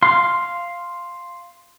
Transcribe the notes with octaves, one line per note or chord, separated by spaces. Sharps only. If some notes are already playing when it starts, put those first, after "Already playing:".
F5 C6